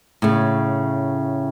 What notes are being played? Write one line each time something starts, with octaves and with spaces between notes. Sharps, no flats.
A2 C#3